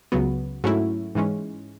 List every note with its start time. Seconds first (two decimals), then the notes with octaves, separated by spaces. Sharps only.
0.12 C#2 C#3 F#3 B3
0.64 G#2 F#3 A3 C#4 E4
1.15 G#2 E3 G#3 C#4